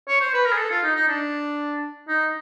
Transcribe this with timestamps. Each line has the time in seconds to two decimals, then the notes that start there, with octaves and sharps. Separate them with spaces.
0.08 C#5
0.21 C5
0.34 B4
0.46 A#4
0.52 G#4
0.58 A4
0.71 F4
0.83 D#4
0.96 D#4
1.08 D4
2.08 D#4